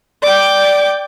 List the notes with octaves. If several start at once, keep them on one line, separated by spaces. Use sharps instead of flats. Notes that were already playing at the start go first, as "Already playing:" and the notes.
D5 G5 D6